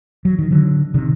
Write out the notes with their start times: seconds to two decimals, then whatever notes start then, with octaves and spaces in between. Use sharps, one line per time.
0.25 F#3
0.39 D#3
0.51 D3 F#3
0.94 C3 D#3